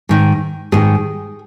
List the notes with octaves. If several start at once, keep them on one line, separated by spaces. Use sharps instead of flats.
G#2 D#3
G#2 D#3 G#4